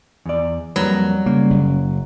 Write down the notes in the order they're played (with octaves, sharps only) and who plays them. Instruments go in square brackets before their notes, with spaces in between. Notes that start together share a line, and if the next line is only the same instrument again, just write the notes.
[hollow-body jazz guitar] E2 D5
[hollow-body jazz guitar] F2 A#3 B4 [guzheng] F#3 [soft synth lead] G3
[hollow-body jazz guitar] C#3 [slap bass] A#3
[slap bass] F#1